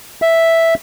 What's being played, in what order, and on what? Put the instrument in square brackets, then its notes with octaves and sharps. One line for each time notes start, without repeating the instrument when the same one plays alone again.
[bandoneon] E5